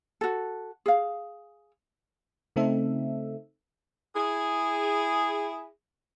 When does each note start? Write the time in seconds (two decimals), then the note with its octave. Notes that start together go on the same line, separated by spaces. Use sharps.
0.21 F#4 A4
0.86 G#4 F5
2.56 C#3 A3 C4 D#4 A4 E5
4.16 E4 G#4